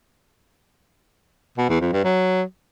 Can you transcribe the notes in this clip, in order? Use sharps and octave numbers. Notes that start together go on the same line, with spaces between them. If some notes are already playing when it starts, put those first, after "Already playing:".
B2
E2
F2
G2
F#3